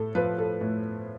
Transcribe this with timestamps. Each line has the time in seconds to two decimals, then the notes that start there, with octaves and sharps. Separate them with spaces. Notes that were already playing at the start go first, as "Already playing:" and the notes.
Already playing: A2 A4
0.15 F3 B4
0.38 A4
0.61 A2